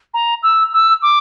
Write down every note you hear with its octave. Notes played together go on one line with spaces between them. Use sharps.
A#5
E6
E6
D6